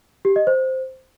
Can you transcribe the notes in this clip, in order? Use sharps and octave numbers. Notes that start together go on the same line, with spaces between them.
G4
D#5
C5